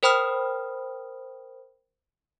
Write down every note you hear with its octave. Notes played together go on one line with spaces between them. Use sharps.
A#4 C5 G5 B5 D#6 F6